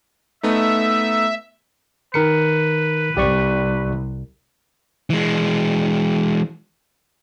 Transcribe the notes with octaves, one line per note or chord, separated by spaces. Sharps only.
A3 B3 D#4 E5
D#3 A#4 B4 C#7
C2 G4 D5 C#6
E3 G#3